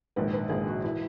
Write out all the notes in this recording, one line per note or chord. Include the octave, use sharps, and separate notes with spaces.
A#1 G#2 D#3 B4
B4
A#1 G#2 D#3 G#4
F#4
E3 E4